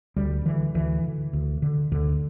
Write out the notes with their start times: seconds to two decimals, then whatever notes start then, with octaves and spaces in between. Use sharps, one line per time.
0.16 D2 G3
0.46 D3 E3
0.74 D2 E3
1.04 D3
1.33 D2
1.62 D3
1.91 D2 D3